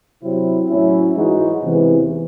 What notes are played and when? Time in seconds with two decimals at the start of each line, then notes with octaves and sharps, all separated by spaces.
0.22 C3 F#3 C4 E4
0.69 A2 F#3 C#4 E4
1.15 G#2 E3 G#3 D#4 F#4
1.62 E2 C3 E3